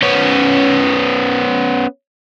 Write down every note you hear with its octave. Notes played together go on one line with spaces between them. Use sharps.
B3 C#4